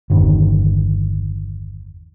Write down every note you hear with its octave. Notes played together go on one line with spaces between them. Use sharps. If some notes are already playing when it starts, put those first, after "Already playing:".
G1 E2 D#3